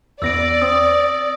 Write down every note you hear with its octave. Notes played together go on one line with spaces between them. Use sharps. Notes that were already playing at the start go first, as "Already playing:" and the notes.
E2 B3 D5 E6 A#6 D7
C4 D#6